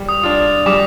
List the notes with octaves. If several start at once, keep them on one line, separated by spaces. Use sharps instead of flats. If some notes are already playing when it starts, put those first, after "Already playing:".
Already playing: G3
D#6
D4 F4
G3 D6